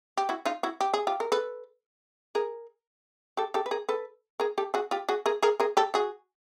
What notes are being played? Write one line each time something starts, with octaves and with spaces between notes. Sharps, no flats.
G4
E4 F#4
D#4 F4
E4 F#4
G4
G#4
F4 G4
A#4
A4 B4
G#4 A#4
G4 A4
G4 A4
B4
G#4 A#4
A4 B4
G#4 A#4
G4 A4
F#4 G#4
F4 G4
F#4 G#4
G#4 A#4
G#4 A#4
G#4 A#4
G4 A4
F#4 G#4